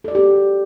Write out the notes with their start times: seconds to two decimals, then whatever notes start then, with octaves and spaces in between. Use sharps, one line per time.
0.04 A4
0.08 D5
0.11 F#4
0.15 G4
0.18 C4